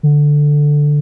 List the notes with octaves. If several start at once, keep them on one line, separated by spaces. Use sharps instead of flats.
D3